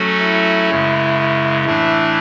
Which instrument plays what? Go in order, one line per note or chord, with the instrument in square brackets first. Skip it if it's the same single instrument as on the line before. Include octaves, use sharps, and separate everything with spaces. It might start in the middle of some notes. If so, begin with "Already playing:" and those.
Already playing: [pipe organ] F#3 A3 C#4 F#4 A4
[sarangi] E4
[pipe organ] F#2 C#3 G#3
[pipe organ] A2 E3 A3 D4 [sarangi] E4